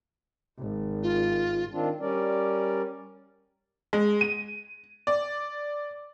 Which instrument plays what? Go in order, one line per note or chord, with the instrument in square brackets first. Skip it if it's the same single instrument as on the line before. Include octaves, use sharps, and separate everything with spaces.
[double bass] G#1
[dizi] F4
[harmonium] D#3 C4 D4 F4
G3 C#4 A#4 D5
[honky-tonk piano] G#3
D#7
D5